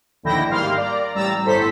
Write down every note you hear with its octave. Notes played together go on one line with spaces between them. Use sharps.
A#1 D#2 D3 E4 G5 A#6
G#2 G3 A#3 F5 C6 F6
D5 A#5
A1 G3 A#5 E6 A6
G1 A2 A4 C5 B6